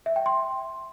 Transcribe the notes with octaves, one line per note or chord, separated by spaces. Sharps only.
E5
G5
C6